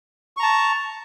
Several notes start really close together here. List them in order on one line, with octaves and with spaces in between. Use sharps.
C#6 A#5 A5